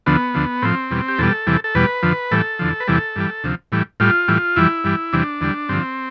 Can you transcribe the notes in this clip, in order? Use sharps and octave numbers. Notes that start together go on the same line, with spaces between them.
D2 D3 F3 B3
D2 D3 F3
A2 F3 C4
E2 B2 G3
G4
E2 B2 G3 A4
E2 C3 E3 G3
A4
E2 B2 G3 B4
F2 D3 F3
A2 E3 G3 A4
E2 D3 F3
B4
E2 C3 E3 G3 A4
G2 E3 G3
D2 C3 F3
A2 E3 G3
A2 G3 F4
A2 E3 G3
F2 E3 G3 E4
G2 E3 G3
E2 C3 E3 G3 D4
E2 D3 G3
G2 D3 F3 C4